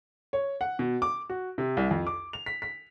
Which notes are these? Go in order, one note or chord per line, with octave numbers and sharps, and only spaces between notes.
C#5
F#5
B2
D6
F#4
C3
C2
F2
D6
F7
B6
B6